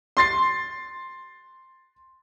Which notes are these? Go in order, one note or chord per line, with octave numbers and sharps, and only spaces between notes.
C6 A6 C7